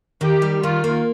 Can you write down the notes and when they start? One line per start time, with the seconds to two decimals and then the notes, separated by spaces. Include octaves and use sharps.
0.21 D#3 G4
0.42 G3
0.63 D#3 F4
0.84 A#3